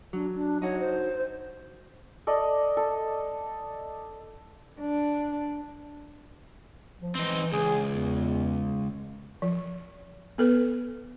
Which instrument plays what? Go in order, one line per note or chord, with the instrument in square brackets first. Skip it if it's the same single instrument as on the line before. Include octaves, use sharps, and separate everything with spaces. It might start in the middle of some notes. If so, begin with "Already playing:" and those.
[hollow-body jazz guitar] F#3 [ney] D4
[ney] D4
[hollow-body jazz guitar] D#4 F#4 [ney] C#5
[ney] C5
[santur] A4 D5 D#5
A4
[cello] D4
[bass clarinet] F3
[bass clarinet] E3 [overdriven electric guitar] C4 D#4
[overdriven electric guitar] C#2 [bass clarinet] G#4
[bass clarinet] E2
[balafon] F3
B3 A4 B4